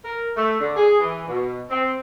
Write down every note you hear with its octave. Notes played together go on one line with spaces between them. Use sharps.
A#4
A3
D3
G#4
E3
B2
C4